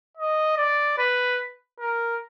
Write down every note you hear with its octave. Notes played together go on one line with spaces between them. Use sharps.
D#5
D5
B4
A#4